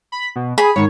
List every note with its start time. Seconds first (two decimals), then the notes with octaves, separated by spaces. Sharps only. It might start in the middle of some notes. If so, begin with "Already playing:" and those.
0.12 B5
0.36 B2
0.58 G#4 B5
0.76 G#2 D#3 C#5